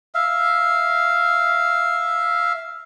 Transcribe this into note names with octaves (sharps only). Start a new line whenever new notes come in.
E5 F5